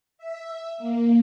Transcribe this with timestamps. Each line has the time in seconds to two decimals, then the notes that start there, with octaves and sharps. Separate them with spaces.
0.18 E5
0.78 A#3